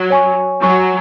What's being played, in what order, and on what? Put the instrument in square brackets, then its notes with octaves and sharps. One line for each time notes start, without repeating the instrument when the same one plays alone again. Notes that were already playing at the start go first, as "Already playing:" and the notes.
Already playing: [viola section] F#3
[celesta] C#5 G#5 C#6
[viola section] F#3 [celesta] C#5 G#5 C#6